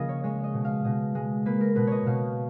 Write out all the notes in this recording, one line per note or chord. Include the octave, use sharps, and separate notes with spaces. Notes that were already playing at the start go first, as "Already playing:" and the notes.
Already playing: C#3 F3 A#3 D#5 F5
C#5
G#3 C#5
D#5
B2
F5
B2 D#5
G#3
A#3 B4
A#4
B2 B4
C#5 D#5
B2 F5